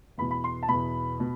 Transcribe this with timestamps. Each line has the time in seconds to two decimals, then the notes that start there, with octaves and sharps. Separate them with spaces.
0.18 E2 B2 B5
0.31 B5
0.44 C6
0.63 A5
0.68 E2 B2 B5
1.20 B2